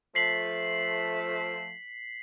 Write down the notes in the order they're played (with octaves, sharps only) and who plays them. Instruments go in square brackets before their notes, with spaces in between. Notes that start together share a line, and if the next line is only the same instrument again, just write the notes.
[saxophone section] F3 A3 [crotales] B6 C7 F#7